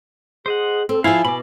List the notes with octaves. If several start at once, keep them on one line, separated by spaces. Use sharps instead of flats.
G#4 C5 D#5 F#5
C4 A4
F3 E4 F4 G#4 F5 G#5
B2 B5 D6